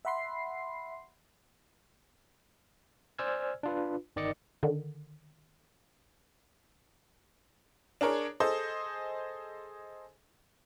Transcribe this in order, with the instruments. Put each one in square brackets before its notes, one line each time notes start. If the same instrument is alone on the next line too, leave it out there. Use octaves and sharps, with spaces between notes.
[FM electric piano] E5 F#5 B5 C6 C7
[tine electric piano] C5 D5 G#5 E6 F6 G#6
D4 F4 B4
G1 D#3 D5 D#5 D6 C#7
[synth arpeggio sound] D3 D#3
[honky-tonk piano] D4 G#4 A#4 C#5
G#4 A4 C5 D#5